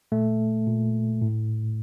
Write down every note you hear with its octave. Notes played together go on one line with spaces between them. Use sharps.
A#2 A3
A#2
A2